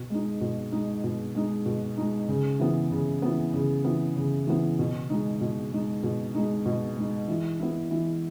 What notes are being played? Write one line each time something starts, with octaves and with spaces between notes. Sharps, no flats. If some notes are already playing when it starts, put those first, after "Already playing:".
Already playing: B2
G#3 D#4
B2
G#3 D#4
B2
G#3 D#4
B2
G#3 D#4
C#3
E3 B3
C#3
E3 B3
C#3
E3 B3
C#3
E3 B3
B2
G#3 D#4
B2
G#3 D#4
B2
G#3 D#4
B2
G#3 D#4
E3
B3 E4
E3